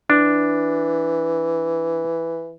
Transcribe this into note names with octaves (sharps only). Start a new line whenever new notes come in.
E3 D4